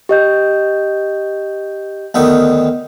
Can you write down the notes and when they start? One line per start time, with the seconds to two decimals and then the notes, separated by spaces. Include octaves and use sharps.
0.09 G4 D#5 G6
2.14 D2 D#3 B3